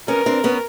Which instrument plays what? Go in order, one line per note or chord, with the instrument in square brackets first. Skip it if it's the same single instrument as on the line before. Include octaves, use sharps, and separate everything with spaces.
[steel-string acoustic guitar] B3 C#4 [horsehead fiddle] A#4
[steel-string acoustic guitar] C4 D4
B3 C#4